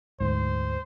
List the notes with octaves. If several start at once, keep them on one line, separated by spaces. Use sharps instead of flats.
D2 G#2 C5